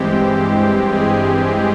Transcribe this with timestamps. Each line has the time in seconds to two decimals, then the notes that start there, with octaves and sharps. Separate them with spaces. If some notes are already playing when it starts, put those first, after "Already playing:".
Already playing: G2 E3 G#3 C4 G4
0.91 G#4